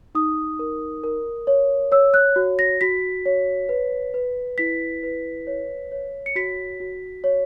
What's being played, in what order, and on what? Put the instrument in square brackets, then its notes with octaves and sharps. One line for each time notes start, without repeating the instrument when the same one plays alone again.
[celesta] D#4 D#6
A#4
A#4
C#5
C#5 E6
F#6
F#4
A#6
F#4 B6
C#5
B4
B4
E4 B6
B4
C#5
C#5
C#7
F#4 B6
F#4
C#5